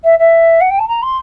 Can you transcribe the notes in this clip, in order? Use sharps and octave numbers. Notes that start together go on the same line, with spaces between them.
E5
E5
F#5
G5
A5
A#5
C6